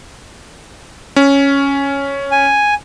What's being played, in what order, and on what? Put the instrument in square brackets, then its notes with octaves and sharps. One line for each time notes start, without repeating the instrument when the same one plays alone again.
[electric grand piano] C#4
[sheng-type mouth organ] G#5